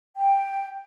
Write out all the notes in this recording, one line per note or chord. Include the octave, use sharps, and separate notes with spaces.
G5